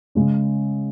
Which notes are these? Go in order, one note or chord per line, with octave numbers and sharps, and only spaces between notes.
C#3 G#3 C#4